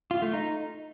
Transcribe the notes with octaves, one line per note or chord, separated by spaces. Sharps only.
F4
A3
D#4